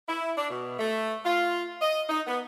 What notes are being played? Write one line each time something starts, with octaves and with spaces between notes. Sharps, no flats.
E4
D4
B2
A3
F4
D#5
D#4
B3